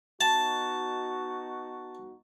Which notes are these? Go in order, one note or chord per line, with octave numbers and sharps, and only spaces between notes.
B2 D#4 F#4 A5